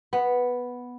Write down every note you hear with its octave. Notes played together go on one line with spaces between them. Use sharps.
B3